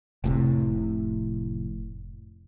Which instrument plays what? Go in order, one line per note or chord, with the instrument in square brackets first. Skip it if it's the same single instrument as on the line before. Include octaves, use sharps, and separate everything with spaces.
[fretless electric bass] F1 A2 C3